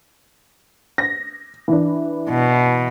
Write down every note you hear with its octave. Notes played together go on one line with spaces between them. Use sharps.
A#6
E3 D4
B2